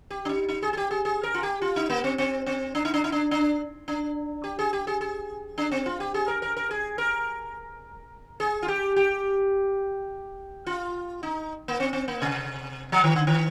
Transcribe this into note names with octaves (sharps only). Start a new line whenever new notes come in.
G4
D4
D#4
D#4
G#4
G#4
G4
G#4
G#4
A#4
F4
G4
F4
D#4
A#3
C4
C4
C4
D4
D#4
D4
D#4
D4
D4
D4
G4
G#4
G4
G#4
G#4
D4
C4
F4
G4
G#4
A#4
A#4
A#4
G#4
A#4
G#4
F4
G4
G4
F4
D#4
A#3
C4
C4
A#3
C3
F3
D#3
D3
D#3